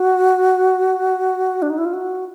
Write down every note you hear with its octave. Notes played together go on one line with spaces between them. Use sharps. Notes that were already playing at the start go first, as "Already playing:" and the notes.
Already playing: F#4
D4
D#4
E4
F4
F#4